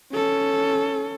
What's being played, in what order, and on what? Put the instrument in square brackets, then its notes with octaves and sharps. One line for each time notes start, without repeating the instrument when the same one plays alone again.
[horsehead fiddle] C#4 A4